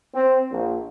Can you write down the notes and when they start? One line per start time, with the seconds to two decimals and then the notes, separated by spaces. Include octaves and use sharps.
0.15 C4
0.51 A#1